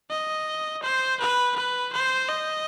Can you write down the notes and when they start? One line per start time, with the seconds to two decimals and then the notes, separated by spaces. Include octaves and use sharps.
0.10 D#5
0.83 C5
1.20 B4
1.56 B4
1.93 C5
2.29 D#5